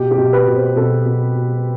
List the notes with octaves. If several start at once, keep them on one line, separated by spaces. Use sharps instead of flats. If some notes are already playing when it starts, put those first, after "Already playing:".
Already playing: B2 G4
G4
B2
B4
B2
C5
B2 A4
B2
B2